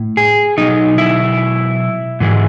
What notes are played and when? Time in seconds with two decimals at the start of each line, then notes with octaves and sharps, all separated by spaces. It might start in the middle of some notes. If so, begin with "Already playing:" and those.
Already playing: A2
0.17 G#4
0.57 B2 F#3 D#4
0.98 E4
2.20 G#2 E3 G#3